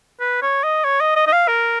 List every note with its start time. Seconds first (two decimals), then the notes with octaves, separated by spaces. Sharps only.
0.20 B4
0.42 C#5
0.63 D#5
0.84 C#5
1.01 D#5
1.16 D#5
1.27 D#5
1.32 F5
1.48 A#4